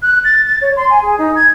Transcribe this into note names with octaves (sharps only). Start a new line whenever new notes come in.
F#6
A6
A6
C#5
C6
G#5
G#4
D#4
G#6